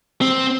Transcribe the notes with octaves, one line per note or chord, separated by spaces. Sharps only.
C4